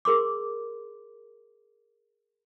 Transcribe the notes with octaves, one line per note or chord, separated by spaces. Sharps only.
G#4 A#4 C6 D6